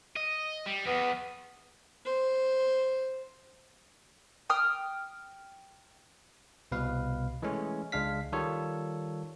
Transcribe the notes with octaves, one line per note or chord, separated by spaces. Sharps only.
D#5
G3
E2 B3
C5
G5 D#6 F6
C2 B2 B4 F5
E3 G#3 A3 C#4
C#2 G#3 D4 F5 B6
D#3 G3 F4 A4 C#5